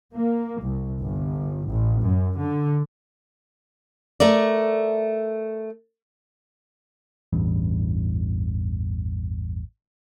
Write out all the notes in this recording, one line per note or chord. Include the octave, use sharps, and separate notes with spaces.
A#3
C2
G1
A1
F#2
D3
A3 A#4 D5
A1 E2 G2